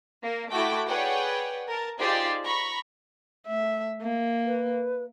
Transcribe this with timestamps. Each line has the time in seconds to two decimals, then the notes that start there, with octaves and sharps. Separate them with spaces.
0.24 A#3
0.52 A3 E4 F#4 G5 D6
0.88 G#4 B4 C#5 D5 F#5 G5
1.68 A#4 A5
1.99 D#4 F4 G4 G#4 C5 D5
2.43 A#5 B5 C#6
3.47 A3 E5
4.02 A#3
4.46 B4